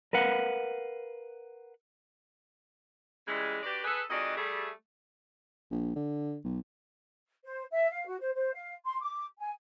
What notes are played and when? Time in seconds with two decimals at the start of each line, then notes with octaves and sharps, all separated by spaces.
0.13 A#4 B4 F5 F#5
3.27 C#3 E3 G3 G#3
3.63 D4 F#4 G4 B4 D5
3.84 G#4 A4 B4
4.10 F2 D#3 G#3 F#4 D5 D#5
4.37 G3 A3 G#4
5.71 A#1
5.96 D3
6.44 B1
7.44 C5
7.71 E5
7.90 F5
8.06 F#4
8.20 C5
8.35 C5
8.54 F5
8.84 C6
9.01 D6
9.38 G#5